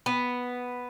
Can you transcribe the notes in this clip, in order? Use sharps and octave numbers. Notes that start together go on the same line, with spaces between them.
B3